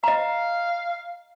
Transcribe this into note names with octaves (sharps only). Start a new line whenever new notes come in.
D#5 F5 A#5